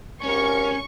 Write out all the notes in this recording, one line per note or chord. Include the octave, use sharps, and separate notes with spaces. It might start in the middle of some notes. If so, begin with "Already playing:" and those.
G#1 C#4 G4 A#4 C#6